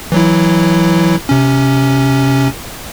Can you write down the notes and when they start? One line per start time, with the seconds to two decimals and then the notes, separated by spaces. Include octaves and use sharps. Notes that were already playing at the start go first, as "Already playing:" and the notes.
0.12 E3 F#3 E4
1.29 C3 C#4